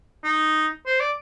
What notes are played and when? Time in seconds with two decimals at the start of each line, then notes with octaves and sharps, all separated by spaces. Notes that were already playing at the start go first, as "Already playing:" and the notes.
0.24 D#4
0.86 C5
1.00 D5